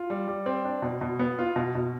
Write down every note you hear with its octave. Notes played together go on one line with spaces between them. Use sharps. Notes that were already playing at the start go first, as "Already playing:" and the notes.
Already playing: F4
G3
G3
C4
D4
B2
B2
B3
F4
B2
B2